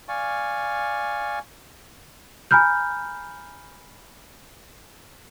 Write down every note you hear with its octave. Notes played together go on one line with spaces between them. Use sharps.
D5 F5 G#5 C#6
G#5 A#5 B5 F6 G6